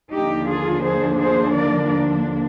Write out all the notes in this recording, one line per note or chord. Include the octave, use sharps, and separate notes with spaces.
D#2 D3 F3 A#3 D4 D#4 G4
F4 G#4
G#4 C5
G#4 C5
A#4 D5